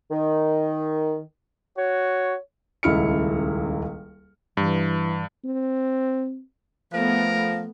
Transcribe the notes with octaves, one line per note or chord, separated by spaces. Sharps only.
D#3
F#4 C#5
D#1 C#2 E4 F6 C#7
G2 E3
C4
F3 A3 B3 A#4